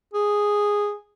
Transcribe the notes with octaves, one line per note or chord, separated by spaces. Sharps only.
G#4